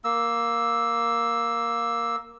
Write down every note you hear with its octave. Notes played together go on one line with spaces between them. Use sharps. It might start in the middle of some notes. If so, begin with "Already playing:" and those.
A#3 E6